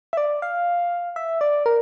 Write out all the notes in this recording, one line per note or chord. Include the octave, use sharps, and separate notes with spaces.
E5
D5
F5
E5
D5
A#4